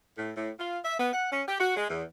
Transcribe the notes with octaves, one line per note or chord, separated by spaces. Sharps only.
A2
A2
F4
E5
B3
F#5
C#4
G4
F#4
G#3
E2